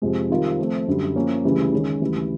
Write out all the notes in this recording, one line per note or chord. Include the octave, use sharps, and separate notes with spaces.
F2 C3 F3 G#3
D#3 G3 C4 F4 A#4
F3 A3 C4
F#2 D3 G3
F3 A#3 C#4
D2 C#3 E3 G3
D#3 G#3 C#4
D2 C#3 E3 G3